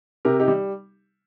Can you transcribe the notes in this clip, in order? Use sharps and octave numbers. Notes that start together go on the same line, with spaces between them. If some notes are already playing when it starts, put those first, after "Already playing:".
C3 G4 A#4
D#4 G4
G3